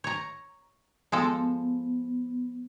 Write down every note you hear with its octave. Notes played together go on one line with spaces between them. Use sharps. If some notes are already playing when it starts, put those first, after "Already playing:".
C#5 A#5
F3 G#3 B3 A4